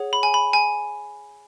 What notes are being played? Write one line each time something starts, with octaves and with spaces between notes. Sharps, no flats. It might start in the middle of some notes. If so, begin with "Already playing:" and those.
Already playing: G#4 C#5 F#5
B5
G#5
B5
G#5